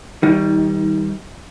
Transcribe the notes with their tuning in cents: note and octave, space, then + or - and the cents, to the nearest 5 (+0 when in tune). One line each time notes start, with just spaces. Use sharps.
D#3 +40 G3 -5 D#4 +25